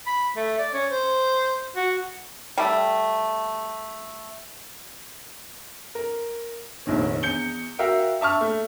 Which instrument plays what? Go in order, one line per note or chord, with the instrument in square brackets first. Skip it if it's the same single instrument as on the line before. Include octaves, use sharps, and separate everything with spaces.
[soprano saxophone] B5
A3
D5
C#4
C5
F#4
[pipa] G3 A3
[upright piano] A#4
F1 A#1 D#3 C#5
E2 G6 C#7 G7
F#4 A#4 E5 F5 G5
E5 A5 C#6 F6
A3